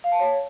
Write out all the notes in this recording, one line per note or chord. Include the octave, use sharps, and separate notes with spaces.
F5
A5
C#5